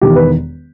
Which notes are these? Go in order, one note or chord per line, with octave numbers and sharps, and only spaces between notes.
E1 E2 D#3 G4
B4